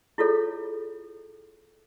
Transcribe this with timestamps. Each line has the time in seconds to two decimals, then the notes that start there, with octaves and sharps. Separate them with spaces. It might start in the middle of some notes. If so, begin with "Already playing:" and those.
0.18 E4 F4 G#4 A4 C#5